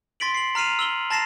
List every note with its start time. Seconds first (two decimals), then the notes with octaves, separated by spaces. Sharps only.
0.20 C6 A6 B6 D7 F#7
0.34 C7 F#7
0.55 A#5 F6 C7 D#7 F7
0.79 E6 F#7 G7
1.10 A5 A#5 A6 A#6 C7 E7